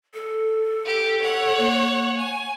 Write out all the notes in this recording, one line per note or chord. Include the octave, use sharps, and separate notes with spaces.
A4
G4
C#5 F#5
A#3
G#5